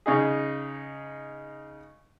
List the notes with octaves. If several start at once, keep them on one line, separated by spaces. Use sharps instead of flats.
C#3 D#4 G#4